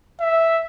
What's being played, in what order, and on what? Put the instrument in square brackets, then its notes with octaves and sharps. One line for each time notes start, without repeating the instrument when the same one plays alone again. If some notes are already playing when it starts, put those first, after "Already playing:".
[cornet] E5